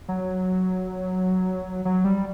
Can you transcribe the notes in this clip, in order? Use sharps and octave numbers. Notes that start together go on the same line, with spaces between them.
F#3
F#3
G3